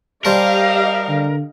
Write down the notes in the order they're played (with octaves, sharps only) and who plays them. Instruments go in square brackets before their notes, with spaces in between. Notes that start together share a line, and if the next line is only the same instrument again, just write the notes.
[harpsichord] G3 C5 A5 [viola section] G4 D#5 F5 [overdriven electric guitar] A#4
[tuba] D3